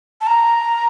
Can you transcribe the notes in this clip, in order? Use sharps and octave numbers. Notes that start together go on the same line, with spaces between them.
A5
A#5